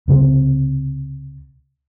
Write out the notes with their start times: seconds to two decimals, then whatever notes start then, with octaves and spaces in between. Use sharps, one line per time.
0.08 C#2 C3 G3 C4